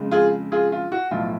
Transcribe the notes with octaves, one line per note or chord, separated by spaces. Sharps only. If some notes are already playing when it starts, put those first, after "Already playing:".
Already playing: F2 C#3 G#3
F4 G#4
F4 G#4
F4
F#4
B1 A2 F3 F4